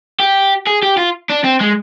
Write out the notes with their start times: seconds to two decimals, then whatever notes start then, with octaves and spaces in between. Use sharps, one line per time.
0.19 G4
0.67 G#4
0.83 G4
0.97 F4
1.30 D4
1.44 C4
1.61 G#3